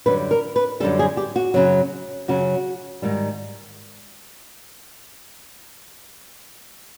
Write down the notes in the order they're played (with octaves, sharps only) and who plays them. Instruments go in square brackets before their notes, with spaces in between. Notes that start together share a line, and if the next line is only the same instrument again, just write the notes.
[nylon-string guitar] F#2 D3 G3 B4
A#4
B4
F#2 D3 G3 A4
G#4
G4
F#4
F#2 C#3 F#3
F#2 C#3 F#3 F#4
G#2 D#3 G3